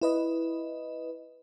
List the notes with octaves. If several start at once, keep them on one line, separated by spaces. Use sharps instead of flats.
E4 B4 D#5